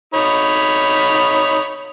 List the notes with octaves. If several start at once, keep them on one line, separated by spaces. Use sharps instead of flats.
D#4 C#5 B5